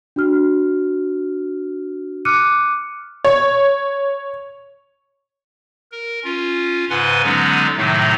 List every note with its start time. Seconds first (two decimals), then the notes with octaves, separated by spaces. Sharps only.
0.16 D4 F#4 F6
2.25 D6 F6 F#6 C#7 D#7
3.25 C#5
5.92 A#4
6.24 C#4 F4
6.90 G#2 C#3 B4 F#5 G#5 C6
7.24 D3 F#3 G#3 B3 C#4 D#4
7.77 A2 C3 D#3 F#3 A3 D#4